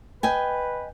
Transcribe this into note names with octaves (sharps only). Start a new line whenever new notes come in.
B4 D#5 G5 G#5